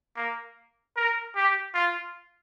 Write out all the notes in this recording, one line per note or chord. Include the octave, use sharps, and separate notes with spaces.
A#3
A#4
G4
F4